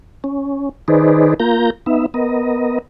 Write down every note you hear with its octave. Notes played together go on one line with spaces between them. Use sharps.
C#4
D#3 D#4 G#4 B4 C5 D5
A#3 F4 A#4 A#5 G6
B3 D#4 E5
B3 A#4 D#5